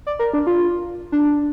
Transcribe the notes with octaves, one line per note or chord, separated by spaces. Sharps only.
D5
A#4
D4
F4
D4